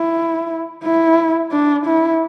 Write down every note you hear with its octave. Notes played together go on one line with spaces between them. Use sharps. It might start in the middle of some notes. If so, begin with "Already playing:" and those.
Already playing: E4
E4
D4
E4